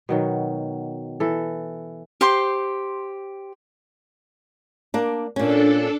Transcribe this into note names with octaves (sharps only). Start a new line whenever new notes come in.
B2 D#3 F#3
E3 A4
G4 C5 C6
A#3 D4
A#2 C#4 D4 A4